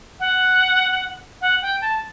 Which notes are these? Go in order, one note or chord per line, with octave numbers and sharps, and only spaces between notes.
F#5
F#5
G5
A5